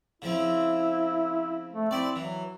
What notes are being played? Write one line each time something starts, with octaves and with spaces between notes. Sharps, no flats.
C#3 F3 C4 E4
A3
C4 E4 D5
E3 F#3